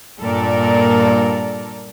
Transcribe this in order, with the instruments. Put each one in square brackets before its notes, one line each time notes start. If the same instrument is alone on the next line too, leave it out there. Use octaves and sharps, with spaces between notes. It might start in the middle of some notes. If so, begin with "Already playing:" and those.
[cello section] G2 A#2 A4 A#4 D5